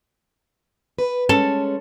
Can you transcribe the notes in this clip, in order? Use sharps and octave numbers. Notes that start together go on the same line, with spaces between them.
B4
G#3 C#4 A4